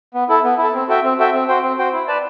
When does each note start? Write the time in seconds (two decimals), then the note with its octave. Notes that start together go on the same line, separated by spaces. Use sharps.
0.14 B3
0.29 E4 A4
0.44 B3
0.58 E4
0.63 A4
0.74 C4
0.88 F#4 A4 E5 G5
1.04 C4
1.19 F#4 A4 E5 G5
1.34 C4
1.48 F#4 C5 G5
1.63 C4
1.78 F#4 C5 G5
1.92 E4
2.08 B4 D5 A5